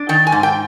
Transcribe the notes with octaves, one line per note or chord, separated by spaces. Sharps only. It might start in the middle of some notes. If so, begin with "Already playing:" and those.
Already playing: D4
D#3 G5
G#5
G#2
G5